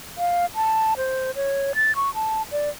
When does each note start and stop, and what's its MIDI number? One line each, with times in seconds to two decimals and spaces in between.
0.18 0.46 77
0.55 0.94 81
0.97 1.31 72
1.35 1.72 73
1.75 1.95 93
1.96 2.13 85
2.15 2.42 81
2.52 2.70 74